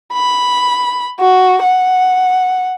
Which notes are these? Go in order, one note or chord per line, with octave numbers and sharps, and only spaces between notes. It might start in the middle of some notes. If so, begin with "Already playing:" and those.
B5
F#4
F#5